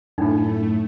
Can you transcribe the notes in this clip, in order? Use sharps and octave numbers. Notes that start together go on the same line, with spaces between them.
F#2 A2 A3 D4 D#4